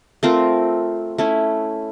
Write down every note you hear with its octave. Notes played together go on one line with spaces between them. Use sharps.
A3 C4 F4 A#4
A3 C#4 E4